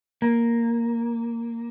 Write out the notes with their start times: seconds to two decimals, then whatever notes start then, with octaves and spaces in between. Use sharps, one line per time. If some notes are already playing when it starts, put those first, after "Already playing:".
0.22 A#3